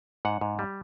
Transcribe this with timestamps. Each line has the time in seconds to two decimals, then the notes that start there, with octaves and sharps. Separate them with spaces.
0.25 G#2 F#5
0.41 G#2
0.59 G3